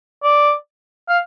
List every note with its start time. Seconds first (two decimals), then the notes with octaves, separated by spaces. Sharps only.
0.24 D5
1.09 F5